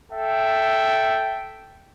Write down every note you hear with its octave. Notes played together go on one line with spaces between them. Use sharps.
A4 E5 G5